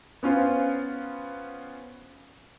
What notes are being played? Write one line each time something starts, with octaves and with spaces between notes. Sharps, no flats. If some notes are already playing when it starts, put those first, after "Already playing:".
B3 C#4 F4 C5